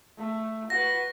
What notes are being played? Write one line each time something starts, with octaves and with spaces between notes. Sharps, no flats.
A3
F#4 B4 A#6